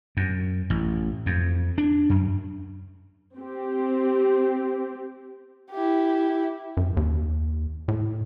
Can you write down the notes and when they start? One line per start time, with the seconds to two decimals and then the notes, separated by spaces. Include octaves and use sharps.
0.17 F#2
0.70 A1
1.26 F2
1.78 D4
2.10 F#2
3.37 C4 G4
5.72 E4 G4
6.77 F#2
6.97 D#2
7.88 A2